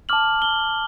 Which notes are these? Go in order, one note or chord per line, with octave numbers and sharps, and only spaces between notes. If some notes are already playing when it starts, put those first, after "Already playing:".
A5 D6 F6 F#7
G7